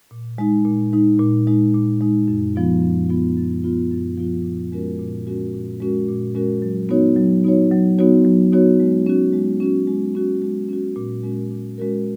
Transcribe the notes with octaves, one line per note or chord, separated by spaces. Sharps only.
A#2
G#3 D#4
A#2
G#3 D#4
A#2
G#3 D#4
A#2
G#3 D#4
F#2
F3 B3 F4
F#2
F3 B3 F4
F#2
F3 B3 F4
F#2
F3 B3 F4
A#2
G#3 C#4 F#4 A#4
A#2
G#3 C#4 F#4 A#4
A#2
G#3 C#4 F#4 A#4
A#2
G#3 C#4 F#4 A#4
F#3
B3 D#4 F#4 C#5
F#3
B3 D#4 F#4 C#5
F#3
B3 D#4 F#4 C#5
F#3
B3 D#4 F#4 C#5
G#3
C#4 F#4
G#3
C#4 F#4
G#3
C#4 F#4
G#3
C#4 F#4
A#2
G#3 C#4 F#4 A#4
A#2
G#3 C#4 F#4 A#4